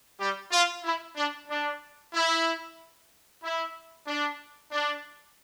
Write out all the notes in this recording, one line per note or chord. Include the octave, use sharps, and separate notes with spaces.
G3 G4
F4
E4
D4
D4
E4
E4
D4
D4